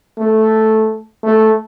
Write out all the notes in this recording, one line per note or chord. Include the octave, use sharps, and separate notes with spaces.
A3
A3